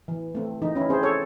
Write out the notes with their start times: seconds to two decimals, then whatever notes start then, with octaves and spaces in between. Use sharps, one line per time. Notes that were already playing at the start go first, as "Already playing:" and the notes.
0.08 E3
0.35 A3 C4
0.62 E3 D#4
0.75 C#4 E4
0.89 C4 G#4 C5
1.03 A4 C#5